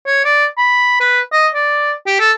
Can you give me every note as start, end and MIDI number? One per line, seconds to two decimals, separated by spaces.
0.06 0.22 73
0.24 0.45 74
0.57 1.00 83
1.00 1.20 71
1.32 1.48 75
1.54 1.92 74
2.06 2.16 67
2.20 2.32 69